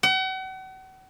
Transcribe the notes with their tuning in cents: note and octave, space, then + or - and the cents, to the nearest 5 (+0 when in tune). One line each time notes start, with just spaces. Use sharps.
F#5 +40